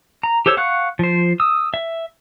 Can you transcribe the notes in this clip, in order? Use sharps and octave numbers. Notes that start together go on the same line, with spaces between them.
A#5
G4 A4 C5 C#5 E6
F5 F#5 C#6 F#6
F3 C5
D#6 E6
E5